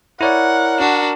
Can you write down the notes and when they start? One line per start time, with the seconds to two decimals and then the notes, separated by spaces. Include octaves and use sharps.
0.21 E4 A#4 C#5 D5 F#5
0.79 D4 F#4